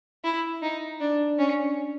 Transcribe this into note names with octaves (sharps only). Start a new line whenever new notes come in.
E4
D#4
D4
C#4